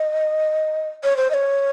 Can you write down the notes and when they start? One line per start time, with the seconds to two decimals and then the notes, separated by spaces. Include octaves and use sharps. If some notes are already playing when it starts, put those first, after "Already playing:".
Already playing: D#5
1.04 C#5
1.17 C5
1.31 D#5
1.34 C#5